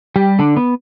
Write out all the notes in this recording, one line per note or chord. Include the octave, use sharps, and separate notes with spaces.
G3 G4
D3 D4
B3